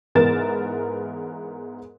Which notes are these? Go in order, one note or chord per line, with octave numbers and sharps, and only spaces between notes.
G#2 E3 B3 A#4 A6 E7